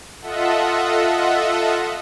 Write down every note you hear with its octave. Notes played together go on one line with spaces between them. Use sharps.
F4 A4 D#5 E5 F#5